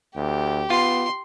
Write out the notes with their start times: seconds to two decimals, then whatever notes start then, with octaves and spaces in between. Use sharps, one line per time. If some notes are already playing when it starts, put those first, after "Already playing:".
0.16 D2 G4
0.70 B3 F4 C6